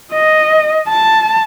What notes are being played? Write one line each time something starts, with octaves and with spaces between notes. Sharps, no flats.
D#5
A5